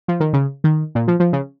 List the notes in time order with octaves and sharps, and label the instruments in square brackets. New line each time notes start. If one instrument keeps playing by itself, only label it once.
[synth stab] F3
D#3
C#3
D#3
A#2
F3
F3
C#3